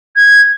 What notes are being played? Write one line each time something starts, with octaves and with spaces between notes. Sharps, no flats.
G#6